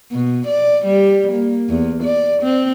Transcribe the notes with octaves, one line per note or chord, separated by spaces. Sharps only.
B2
D5
G3
A#3
E2
D5
C4